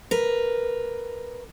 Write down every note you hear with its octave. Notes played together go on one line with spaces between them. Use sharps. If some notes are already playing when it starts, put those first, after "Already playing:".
A#4 B4